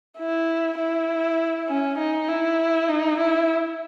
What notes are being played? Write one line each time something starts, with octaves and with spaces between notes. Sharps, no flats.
E4
E4
C#4
D#4
E4
D#4
E4